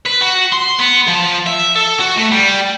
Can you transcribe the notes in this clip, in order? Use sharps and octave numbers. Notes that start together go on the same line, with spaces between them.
B4
F#4
C6
B3
F3
E5
A4
F#4
A3
G3